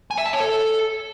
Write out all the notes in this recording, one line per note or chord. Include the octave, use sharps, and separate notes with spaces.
G#5
E5
A5
C#5
A4